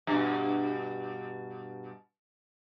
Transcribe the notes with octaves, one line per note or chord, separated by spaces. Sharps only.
G2 B2